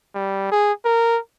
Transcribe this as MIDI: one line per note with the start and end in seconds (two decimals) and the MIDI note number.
0.15 0.49 55
0.51 0.72 68
0.85 1.18 70